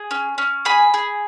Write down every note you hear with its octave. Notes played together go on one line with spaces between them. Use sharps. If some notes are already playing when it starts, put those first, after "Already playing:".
Already playing: G#4
C#4
C#4
G#4 G#5 B5
G#4